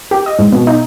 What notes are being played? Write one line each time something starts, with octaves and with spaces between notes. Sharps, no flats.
G4
D#5
G#2
B2
D#4